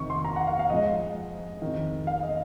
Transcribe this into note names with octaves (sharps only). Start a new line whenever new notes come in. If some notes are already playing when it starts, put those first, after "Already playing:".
Already playing: F2 C3 D#3 C#6
C6
A#5
F#5
F5
F5
G#2 F3 D#5
F2 D#3
F5
D#5